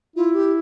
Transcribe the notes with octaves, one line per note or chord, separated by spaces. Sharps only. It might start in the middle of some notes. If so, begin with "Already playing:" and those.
E4 F4
G4